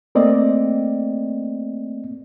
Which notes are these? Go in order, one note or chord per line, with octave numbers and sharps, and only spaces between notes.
A3 A#3 C4 D5 D#5